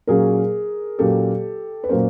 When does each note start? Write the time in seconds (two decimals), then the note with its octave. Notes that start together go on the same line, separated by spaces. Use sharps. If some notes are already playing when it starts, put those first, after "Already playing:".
0.07 A#2 F#3 A#3 C#4 G#4 A#4
0.99 A#2 F#3 A#3 C#4 G4 A4
1.84 B4
1.89 A#2 F#3 A#3 C#4 A#4 C5